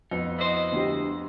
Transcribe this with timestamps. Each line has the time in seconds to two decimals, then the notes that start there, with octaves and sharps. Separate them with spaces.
0.11 F2 B3 D#4
0.39 E4 F#4 C5 D#5
0.72 D2 G4